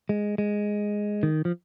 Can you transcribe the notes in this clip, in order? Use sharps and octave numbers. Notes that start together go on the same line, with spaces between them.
G#3
G#3
D#3
F3